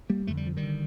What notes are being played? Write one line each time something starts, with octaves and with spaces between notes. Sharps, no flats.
G3 A#3
F2 D3 A3
G3
F3
D#3 G3
D3